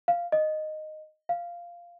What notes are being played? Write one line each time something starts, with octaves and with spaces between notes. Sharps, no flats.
F5
D#5
F5